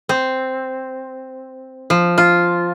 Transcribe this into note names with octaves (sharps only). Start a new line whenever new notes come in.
C4
F3
F4